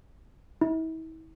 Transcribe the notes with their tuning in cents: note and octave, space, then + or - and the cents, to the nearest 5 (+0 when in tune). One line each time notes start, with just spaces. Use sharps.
E4 -40